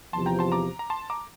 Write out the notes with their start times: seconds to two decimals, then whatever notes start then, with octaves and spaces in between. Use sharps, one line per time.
0.13 E2 C3 F3 A5 C6
0.26 G5 A#5
0.39 A5 C6
0.52 A#5 D6
0.79 A#5
0.90 A5 C6
1.10 A#5 D6